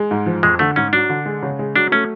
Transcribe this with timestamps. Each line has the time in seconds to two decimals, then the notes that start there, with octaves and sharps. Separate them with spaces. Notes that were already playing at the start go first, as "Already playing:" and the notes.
Already playing: G#3
0.11 G#2
0.26 F3
0.43 F2 G#3
0.59 D3 A3
0.76 G#2 C#4
0.93 F#3 D4
1.09 D3
1.26 G#3
1.43 C#3
1.59 G#3
1.76 F#3 D4
1.92 A3 C#4